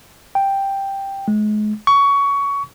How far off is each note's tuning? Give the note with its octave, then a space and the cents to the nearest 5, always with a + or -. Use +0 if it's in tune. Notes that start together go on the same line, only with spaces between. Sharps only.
G5 +5
G#3 +35
C#6 +20